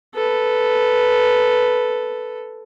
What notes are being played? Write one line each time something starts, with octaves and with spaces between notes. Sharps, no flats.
A4 B4